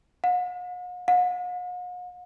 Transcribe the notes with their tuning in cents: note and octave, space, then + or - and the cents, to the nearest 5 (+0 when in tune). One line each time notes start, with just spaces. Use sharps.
F#5 -45
F#5 -45